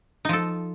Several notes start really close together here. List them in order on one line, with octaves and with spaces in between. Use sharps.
D#4 F3 A4